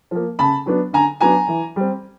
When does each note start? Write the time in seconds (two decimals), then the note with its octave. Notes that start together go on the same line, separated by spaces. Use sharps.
0.11 F3 A#3
0.39 C#3 A5 B5
0.66 F#3 B3 D4
0.93 D3 G#5 A#5
1.21 F#3 B3 D4 G#5 A#5
1.48 E3
1.76 G3 C4